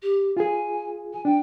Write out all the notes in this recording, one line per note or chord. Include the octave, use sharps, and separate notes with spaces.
G4
F4 G#4 G#5
G#5
D4 G5